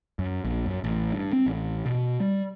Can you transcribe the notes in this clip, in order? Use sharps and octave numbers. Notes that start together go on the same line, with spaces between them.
F#2
A#1
F#2
A1
G2
C4
A1
B2
G3